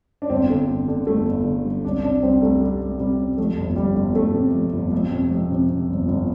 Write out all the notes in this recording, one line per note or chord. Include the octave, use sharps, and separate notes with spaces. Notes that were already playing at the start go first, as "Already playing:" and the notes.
D4
G1 C4
D3
G1
D3
G1 A3
G1
D3
G2
C2 D4
C3 D4
C2 C4
C2 A3
C3 G3
C2
C3 G3
C3
F2 A3
G1
G1 G3
G1
G1 A3
C3
F2
G1
F2
C3
F2
C3
C3
G1
G1